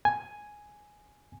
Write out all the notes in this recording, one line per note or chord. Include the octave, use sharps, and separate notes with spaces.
G#5